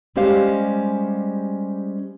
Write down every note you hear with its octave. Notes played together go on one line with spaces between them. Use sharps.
G3 G#3 C#4 G4 C5 F5